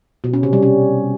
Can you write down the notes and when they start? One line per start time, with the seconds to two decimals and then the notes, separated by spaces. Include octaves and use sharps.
0.24 B2
0.33 C#4
0.43 C3
0.53 G3
0.63 C#4